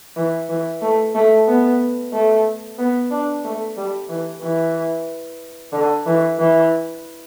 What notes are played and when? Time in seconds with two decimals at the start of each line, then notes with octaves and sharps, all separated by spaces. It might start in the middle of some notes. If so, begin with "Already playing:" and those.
0.16 E3
0.49 E3
0.82 A3
1.15 A3
1.48 B3
2.13 A3
2.78 B3
3.11 D4
3.44 A3
3.77 G3
4.09 E3
4.42 E3
5.72 D3
6.06 E3
6.39 E3